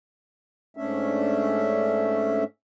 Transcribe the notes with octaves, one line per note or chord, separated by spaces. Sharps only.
G#2 A3 C#4 D4 E5